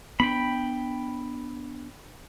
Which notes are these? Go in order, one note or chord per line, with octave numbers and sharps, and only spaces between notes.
B3 C#4 D4 G5 B5